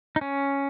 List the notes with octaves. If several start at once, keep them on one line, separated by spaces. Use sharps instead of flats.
D#4
C#4